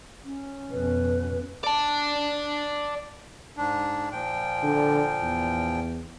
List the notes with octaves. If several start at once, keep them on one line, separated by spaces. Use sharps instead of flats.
C#4
F2 B2 B4
D5 A5
G#2 D4
A#2 F3 G5
D3
E2